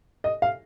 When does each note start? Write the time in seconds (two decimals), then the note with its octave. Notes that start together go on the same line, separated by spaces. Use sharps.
0.24 D#5
0.42 F5